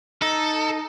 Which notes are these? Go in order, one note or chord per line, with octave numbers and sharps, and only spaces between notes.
D#4 A4